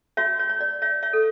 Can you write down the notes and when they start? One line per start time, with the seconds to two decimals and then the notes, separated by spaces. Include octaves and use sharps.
0.17 F#4 C#5 E5
0.39 C#5
0.49 C#5
0.61 D5
0.82 C#5 E5
1.03 C#5 E5
1.13 A4